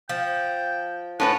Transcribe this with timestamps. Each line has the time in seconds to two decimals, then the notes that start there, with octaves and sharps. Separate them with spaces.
0.09 F3 G5
1.20 A2 C#4 B4 F#5 A5